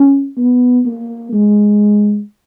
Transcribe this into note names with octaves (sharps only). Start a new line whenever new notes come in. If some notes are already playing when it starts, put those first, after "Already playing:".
Already playing: C#4
B3
A#3
G#3